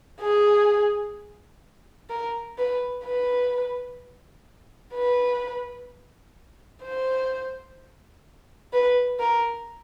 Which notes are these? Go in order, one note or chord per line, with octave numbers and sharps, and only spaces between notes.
G#4
A#4
B4
B4
B4
C5
B4
A#4